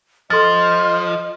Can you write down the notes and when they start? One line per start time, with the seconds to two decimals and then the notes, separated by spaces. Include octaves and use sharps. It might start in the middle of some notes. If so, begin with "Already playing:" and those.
0.30 F3 A4 D#5 C6 F6 A6